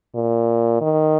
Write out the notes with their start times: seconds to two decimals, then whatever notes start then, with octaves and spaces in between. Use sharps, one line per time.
0.15 A#2
0.81 D#3